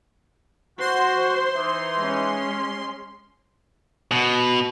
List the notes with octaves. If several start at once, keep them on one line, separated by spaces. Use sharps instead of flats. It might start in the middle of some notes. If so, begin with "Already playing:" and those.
F#4 C5 C6
E3 D#4
G#3 C#4
B2